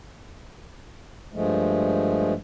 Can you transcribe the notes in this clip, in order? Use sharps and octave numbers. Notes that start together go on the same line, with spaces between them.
G2 F3 G#3 A3